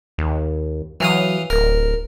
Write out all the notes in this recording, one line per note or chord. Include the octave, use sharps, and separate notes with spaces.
D#2
E3 F#3 F5 D#6
D1 A#4